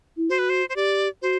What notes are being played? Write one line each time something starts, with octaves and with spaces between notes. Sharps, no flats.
E4
F#4 C5
B4
C5
C5
G4 D5
F#4 C5